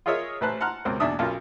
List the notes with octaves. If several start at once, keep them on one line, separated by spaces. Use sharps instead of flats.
F4 G#4 A#4 C#5 D#5 E5
A1 B4 C5 A5 F#6
F#5 A5 A#5 C6 F6 F#6
C#2 B2 A#3 C4
E2 B2 D4 E5 D#6
B1 C#4 F4 A#4 A5